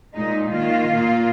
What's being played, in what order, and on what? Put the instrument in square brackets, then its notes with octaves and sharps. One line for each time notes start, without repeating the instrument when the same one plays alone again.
[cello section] A#2 G#3 D#4
D#3 A#3 F4
A#2 A#3